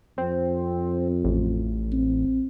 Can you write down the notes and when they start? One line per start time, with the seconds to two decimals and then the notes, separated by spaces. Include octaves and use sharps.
0.18 F2 C4
1.24 A1
1.92 C4